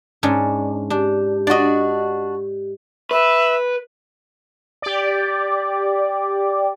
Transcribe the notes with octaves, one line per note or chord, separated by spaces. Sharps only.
G#2 C#4 D4
D4 G4
D4 F#4 D5 D#5
B4 E5
G4 D5